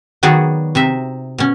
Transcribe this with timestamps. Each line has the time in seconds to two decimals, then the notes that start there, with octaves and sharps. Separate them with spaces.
0.23 D#3 F#3 B3 F#4 G#4 D5
0.75 C3 D#4 E5
1.38 B2 C#4